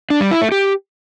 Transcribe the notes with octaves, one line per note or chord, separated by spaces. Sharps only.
D4
G3
E4
A3
G4